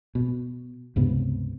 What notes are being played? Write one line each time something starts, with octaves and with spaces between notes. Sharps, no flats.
B2
C#2 G2 C3 B3